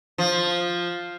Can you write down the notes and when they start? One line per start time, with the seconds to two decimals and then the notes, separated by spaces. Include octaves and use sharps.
0.18 F3